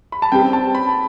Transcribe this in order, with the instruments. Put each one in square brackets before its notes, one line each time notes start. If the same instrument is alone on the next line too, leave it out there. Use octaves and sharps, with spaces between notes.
[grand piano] B5
A5
[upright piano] G3 C4 G4 B4 [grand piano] G5
[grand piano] A5
B5